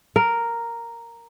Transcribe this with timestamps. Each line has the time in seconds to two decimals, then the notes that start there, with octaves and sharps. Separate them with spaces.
0.16 A#4